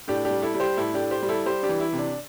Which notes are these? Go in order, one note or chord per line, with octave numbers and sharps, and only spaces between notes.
A2 D4 G4
D4 G4
G3
E4 A4
G3
G4 C5
A2 E4 A4
D4 G4
A2
G4 C5
G3
E4 A4
G3 G4 C5
D4 G4
E3
E4
C3
D4